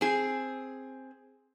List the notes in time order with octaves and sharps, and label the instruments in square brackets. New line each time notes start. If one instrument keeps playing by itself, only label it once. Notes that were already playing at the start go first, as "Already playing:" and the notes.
[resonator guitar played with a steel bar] C4 G#4